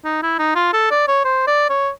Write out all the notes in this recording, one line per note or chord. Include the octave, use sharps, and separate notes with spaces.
D#4
E4
D#4
F4
A4
D5
C#5
C5
D5
C#5